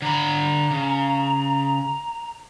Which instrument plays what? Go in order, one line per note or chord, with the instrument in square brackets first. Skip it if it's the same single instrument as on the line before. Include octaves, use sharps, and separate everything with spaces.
[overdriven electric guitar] D3 B5 [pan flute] A#5
[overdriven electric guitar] C#3